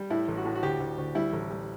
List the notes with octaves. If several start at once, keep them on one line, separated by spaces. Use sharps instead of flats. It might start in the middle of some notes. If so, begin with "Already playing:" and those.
Already playing: G3
A2 E4
A1
F#4
A2
F#4
D2 G4
D2
D2
G3 E4
A1
G3